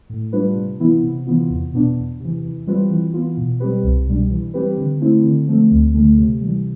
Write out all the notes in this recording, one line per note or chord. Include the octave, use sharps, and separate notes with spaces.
A2
G3 D4 F4 B4
C3
E3 B3 E4
C3
E3 B3 F4
E2
B2 B3 D4
E2
C3 E3
E3
G3 C4 F4 B4
E3
B3 F4
B2
G3 C4 G4 B4
C2
B2 G3 D4
E3
G3 C4 G4 B4
D3
A3 C4 E4
D3
F3 A3 C4
D2
D3 A3
C3
E3 G3